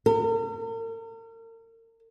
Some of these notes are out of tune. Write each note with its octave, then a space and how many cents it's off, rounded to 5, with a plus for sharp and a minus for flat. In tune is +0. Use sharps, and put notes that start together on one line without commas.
A#4 -40